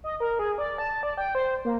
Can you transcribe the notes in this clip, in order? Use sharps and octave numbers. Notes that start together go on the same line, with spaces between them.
D#5
A#4
G#4
D5
A5
D5
G5
C5
A#3